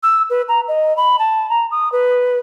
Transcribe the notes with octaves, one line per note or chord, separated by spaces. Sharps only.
E6
B4
A#5
D#5
B5
A5
A#5
D#6
B4